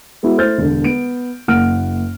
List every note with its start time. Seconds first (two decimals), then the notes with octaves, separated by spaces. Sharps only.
0.23 G#3 B3 E4 F#4
0.37 A3 E4 C5 F6 G6 A6
0.58 E1 D3
0.84 B3 D7
1.48 F#1 A#3 F#5 F6 D7